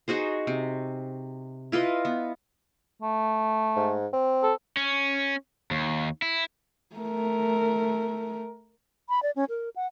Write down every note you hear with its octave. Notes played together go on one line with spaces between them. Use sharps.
D#4 F#4 G#4 C5
C3
E4 F4 B4 D#5
B3
A3
G#2
C4
A4
C#4
D#2
E4
A3 A#4
B5
D5
C#4
A#4
F#5